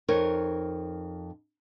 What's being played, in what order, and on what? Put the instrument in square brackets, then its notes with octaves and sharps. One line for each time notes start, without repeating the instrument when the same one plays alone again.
[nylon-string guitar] F2 D#4 A#4 C#5